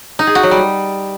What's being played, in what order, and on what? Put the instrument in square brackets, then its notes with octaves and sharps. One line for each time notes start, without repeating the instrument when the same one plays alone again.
[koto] D#4
G#4
F#4
F#3
G3